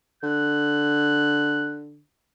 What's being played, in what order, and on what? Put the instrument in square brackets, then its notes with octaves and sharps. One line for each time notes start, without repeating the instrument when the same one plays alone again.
[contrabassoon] D3 [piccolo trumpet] F#6